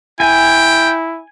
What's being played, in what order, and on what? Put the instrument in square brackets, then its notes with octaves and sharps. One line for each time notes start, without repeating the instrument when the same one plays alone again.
[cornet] E4 [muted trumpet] G5 [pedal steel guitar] G#5